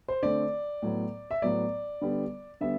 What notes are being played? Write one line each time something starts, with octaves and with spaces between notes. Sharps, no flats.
C5
D3 A3 C4 D5
A2 F#3 B3
E5
A2 F#3 B3 D5
D3 G3 B3
D3 G3 B3 E5